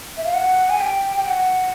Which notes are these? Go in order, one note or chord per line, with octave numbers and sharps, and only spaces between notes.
E5
F5
F#5
G#5
G5
G5
F#5